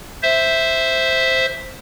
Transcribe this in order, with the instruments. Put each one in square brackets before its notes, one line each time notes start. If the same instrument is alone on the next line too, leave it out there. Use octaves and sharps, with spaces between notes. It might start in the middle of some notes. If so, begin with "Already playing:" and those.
[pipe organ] C5 E5